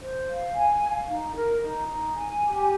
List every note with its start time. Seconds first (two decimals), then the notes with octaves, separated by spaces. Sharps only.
0.02 C5
0.29 F5
0.55 G#5
0.82 F5
1.08 D#4
1.36 A#4
1.61 D#4
1.88 D#4
2.15 G#5
2.42 G4